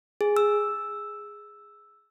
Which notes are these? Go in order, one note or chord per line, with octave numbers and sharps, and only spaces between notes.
G#4
E6